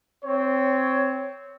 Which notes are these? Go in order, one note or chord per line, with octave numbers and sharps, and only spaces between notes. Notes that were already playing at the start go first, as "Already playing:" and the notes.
C4 C#5